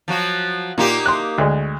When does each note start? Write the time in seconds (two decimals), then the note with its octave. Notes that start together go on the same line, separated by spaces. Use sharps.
0.08 F3 F#3 F#4
0.78 A#2 A#3 D#4 G4
1.06 C6 F#6
1.38 D2 G#3